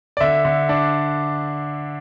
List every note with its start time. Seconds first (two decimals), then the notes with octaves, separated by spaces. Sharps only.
0.17 D5
0.20 D3 E5
0.45 D3
0.69 D4